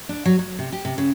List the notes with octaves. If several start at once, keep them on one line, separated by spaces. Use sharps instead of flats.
D4
F#3
F#3
C3
G4
C3
C#3